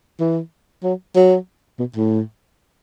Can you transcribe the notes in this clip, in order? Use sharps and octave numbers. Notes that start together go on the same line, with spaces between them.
E3
F#3
F#3
B2
A2